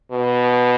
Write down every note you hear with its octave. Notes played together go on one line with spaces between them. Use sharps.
B2